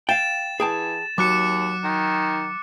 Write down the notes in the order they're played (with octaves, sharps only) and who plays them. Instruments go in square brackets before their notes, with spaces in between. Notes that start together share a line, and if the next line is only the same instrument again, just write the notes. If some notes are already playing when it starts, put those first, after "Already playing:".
[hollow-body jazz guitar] F5 G5 [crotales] A6 E7
[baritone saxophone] E3 [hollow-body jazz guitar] G#4 G5 A5
[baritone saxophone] D#2 [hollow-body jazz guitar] F#3 [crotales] D6 F#6 C#7
[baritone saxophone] D#3